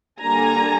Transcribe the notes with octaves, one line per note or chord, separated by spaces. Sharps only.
D3 G3 A#3 D4 G#5 A#5